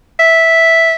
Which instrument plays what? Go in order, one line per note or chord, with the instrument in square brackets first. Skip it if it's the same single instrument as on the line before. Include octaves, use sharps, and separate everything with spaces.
[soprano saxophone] E5